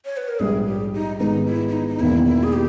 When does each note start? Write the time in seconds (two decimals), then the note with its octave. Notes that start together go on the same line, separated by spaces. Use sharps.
0.05 C#5
0.17 B4
0.28 A#4
0.39 A#1 G#2 G3 G#4
0.66 G4
0.94 D#4
1.19 G#2 D#3 G#3 B3 D#4
1.47 E4
1.68 E4
1.72 D#4
1.88 D#4
2.00 E1 E2 D#3 A#3 E4
2.26 E4
2.43 G#4
2.53 G4